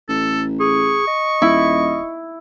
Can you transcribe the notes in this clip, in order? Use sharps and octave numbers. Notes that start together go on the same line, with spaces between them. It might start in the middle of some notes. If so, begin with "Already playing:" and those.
A1 A4
G#4 C#6
D#5
D#1 E4